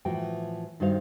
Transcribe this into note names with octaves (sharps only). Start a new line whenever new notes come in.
A2 E3 F3 F#4 G5
G2 D#3 F#4 C5 F5